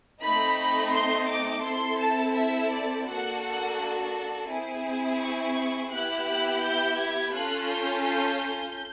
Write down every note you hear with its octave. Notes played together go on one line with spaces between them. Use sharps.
A3 C4 D#4 B5
B5
C6
D6
C4 E4 A4 C6
A5
E5
D5
A#3 D4 F#4 A4 F#5
F#5
C4 E4 G#4
C#6
B3 E4 G4 F#6
F#6
G6
G#6
C#4 F4 A4 F#6
G6
G6
G6